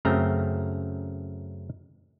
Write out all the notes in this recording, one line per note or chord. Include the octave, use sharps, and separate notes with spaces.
F#2 C#3 A3 C4 A#5